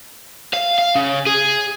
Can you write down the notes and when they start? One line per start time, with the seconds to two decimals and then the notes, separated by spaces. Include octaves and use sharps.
0.54 F5
0.79 F5
0.96 C#3
1.27 G#4